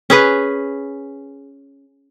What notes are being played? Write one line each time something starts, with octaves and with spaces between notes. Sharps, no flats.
C#4 G#4 B4